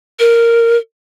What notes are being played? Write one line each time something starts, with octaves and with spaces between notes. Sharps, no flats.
A#4